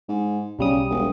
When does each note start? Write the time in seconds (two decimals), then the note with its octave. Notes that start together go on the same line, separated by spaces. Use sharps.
0.09 G#2
0.59 B1 C#3 G3 D#6
0.90 E1